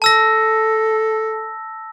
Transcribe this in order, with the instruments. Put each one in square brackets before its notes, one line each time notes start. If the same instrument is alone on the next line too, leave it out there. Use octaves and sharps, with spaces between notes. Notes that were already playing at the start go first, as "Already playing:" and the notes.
[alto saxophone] A4 [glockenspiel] A5 E6 A#6